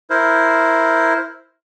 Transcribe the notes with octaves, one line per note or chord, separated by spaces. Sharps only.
E4 A#4 C5